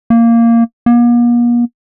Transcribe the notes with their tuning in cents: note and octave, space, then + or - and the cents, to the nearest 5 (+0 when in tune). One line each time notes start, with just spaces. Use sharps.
A#3 -10
A#3 +45